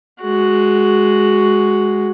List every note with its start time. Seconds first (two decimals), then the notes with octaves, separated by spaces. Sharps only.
0.21 G#3 F#4